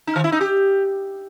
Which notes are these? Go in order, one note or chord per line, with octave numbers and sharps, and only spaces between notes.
D#4
D#3
E4
D#4
G4